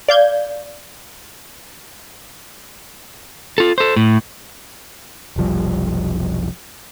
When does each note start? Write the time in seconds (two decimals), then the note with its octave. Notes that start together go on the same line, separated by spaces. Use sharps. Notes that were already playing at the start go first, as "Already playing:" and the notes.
0.08 D5 F5 G6 G#6
3.58 F4 A4
3.78 A4 C5
3.96 A2
5.36 F1 B1 F3 G3